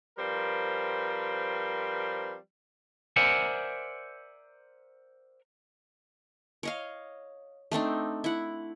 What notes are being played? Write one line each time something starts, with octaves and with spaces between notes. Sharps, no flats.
F3 G3 C4 A#4 B4
A#4 C5 D5 E5 F#5 G#5
C#5 D#5 F5
A3 C4 D4 D#4
E4 F#5